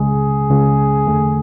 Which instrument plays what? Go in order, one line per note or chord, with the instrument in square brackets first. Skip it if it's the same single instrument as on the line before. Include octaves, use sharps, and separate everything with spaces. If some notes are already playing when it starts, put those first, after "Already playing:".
Already playing: [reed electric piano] C#2 C#3 G#3 [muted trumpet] G#4
[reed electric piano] C#2 C#3 G#3
E2 D3 A3